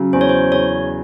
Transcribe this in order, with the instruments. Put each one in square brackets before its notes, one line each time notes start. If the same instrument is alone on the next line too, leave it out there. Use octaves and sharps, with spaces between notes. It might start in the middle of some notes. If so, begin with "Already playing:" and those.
Already playing: [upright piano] C#3 F#3
[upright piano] E2 [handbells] C5
[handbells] C#5
C5
[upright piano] E2 [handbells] C#5